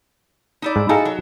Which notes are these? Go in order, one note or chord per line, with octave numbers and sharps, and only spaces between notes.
D#4 E4 D5
G#2
D#4 E4 F#4 G#4 A4 F5
F#3